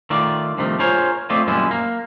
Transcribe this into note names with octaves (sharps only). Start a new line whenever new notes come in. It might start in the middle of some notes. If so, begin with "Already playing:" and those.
D#3 A3 F4 D5
G2 C3 D#3 F3 A3
F4 G#4 A#4 C5 C#5
A3 C4 F4 D5 D#5
F#2 A#2 D#3 G3 G#3 E4
A#3